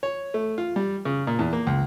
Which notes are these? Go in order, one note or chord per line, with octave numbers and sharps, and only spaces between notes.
C#5
A3
F4
G3
C#3
A#2
E2
A#3
C#2